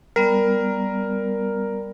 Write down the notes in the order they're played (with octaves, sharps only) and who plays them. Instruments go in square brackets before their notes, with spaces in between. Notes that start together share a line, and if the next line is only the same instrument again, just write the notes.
[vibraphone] G3 B3 D5 [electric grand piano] A#4